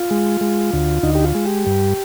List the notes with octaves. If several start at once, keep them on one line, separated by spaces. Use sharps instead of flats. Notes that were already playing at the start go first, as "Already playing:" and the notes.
Already playing: F4
G#3
G#3
D2
D2 D#4
G4
F4
G#3
G4
G2